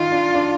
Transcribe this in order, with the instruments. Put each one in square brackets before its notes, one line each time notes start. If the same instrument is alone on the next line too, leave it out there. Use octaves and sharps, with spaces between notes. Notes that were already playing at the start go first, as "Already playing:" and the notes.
Already playing: [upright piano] D#3 D#4 [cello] F4
[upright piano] D4
D4